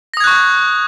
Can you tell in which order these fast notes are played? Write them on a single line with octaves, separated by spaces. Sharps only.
A#6 D#6 G#6 F#6 C#6